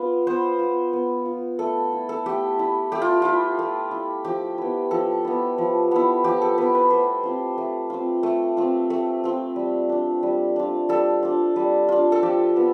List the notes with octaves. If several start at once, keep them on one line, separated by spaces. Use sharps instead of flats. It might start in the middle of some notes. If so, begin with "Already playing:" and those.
Already playing: B3 F4
B3 C5
F4
B3
F4
A3 A4
E4
A4
A3 G4
E4
A3 G4
F4
E4 F4
A3
E4
F3 G4
B3 E4
F3 A4
B3 E4
F3
B3 E4
F3 G4
A4
B3 E4 B4
B4
A3 C5
C4 F4
A3
C4 F4
A3
C4 F4
A3
C4 F4
G3
D4 F4
G3
D4 F4
G3 A4
D4 F4
G3
D4 F4
A4
F3 G4
B3 F4